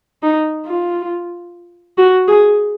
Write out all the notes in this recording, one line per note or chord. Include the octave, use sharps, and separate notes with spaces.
D#4
F4
F#4
G#4